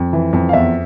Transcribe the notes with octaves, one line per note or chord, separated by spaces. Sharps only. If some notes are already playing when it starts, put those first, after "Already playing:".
Already playing: F2
E3
F2
F5
E2 E5